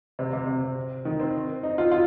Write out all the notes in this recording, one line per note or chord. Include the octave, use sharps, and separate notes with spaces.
C3
C3
C3
D#3
C4
D#4
F4
F4